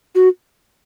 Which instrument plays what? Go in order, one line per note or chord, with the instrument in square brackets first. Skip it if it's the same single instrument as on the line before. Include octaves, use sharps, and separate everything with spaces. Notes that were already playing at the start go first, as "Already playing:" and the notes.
[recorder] F#4